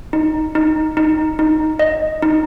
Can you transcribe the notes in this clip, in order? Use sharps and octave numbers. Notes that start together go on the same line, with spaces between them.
D#4
D#4
D#4
D#4
D#5
D#4